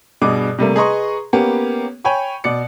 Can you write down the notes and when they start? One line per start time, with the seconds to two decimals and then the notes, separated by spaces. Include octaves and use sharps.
0.21 G2 B2 G#4 D#5 D6
0.58 C3 G3 A3 A#3
0.76 G#4 B4 D#5 A#5 C6 C#6
1.33 A#3 B3 C#4 G4
2.04 C#5 G5 G#5 B5 C#6
2.44 B2 D5 C#7